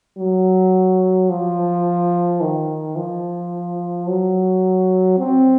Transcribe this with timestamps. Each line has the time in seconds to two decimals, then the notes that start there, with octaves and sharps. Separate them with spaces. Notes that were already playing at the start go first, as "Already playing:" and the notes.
0.19 F#3
1.29 F3
2.41 D#3
2.96 F3
4.08 F#3
5.18 C4